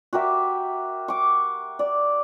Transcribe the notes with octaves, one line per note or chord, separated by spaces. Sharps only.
F#4 G4 A#4 E5
C#6 D6
D5